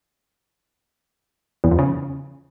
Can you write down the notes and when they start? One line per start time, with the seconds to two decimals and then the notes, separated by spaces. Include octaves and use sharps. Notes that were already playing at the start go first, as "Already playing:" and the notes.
1.64 E2
1.71 F2
1.79 C#3